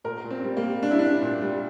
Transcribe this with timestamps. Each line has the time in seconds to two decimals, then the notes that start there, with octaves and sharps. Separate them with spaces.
0.04 A#2 A#4
0.24 A#2
0.31 C4
0.44 G3
0.57 A#3
0.64 G3
0.83 G3 D4
0.91 E4
0.99 G3 D4
1.22 A#2
1.42 G3